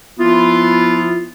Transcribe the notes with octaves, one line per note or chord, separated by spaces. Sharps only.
F3 B3 E4 F4